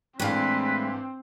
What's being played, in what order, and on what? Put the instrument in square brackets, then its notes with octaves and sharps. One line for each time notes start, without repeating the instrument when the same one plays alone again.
[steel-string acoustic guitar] A2 G#3 [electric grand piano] E3 D4 F5 [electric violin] C4 [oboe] B4